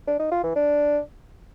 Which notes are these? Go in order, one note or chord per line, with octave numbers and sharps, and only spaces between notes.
D4
D#4
F4
E3
D4